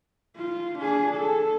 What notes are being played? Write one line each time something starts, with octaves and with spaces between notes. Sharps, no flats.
F4
D4 G#4
A4